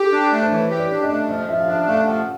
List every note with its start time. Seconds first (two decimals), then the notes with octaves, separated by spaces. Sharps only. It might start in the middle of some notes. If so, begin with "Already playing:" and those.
Already playing: G4 A4
0.12 D4
0.32 A3
0.42 C5
0.51 E3 C#5
0.70 G4
0.78 D5
0.91 D4
1.03 D#5
1.10 A3
1.29 F3 D#5
1.49 F3 E5
1.61 F5
1.68 D4 E5
1.87 A3 F5
2.07 F3 F#5